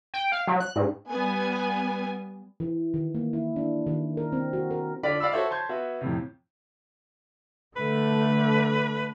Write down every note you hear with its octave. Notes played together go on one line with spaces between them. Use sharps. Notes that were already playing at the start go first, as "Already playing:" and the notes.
G5
F5
F#3
F#6
G#2
G3 B3 G#5
E3
D#3
A#3
E4
D4
D#3
A#4
C4
F#4
A#4
D3 F4 D5 B6
D5 F5 B5 E6
F#4 A4 C5 C#5 E5
A5 C6 G6 G#6
B3 F#4 E5
F2 A2 C3
D3 A3 B4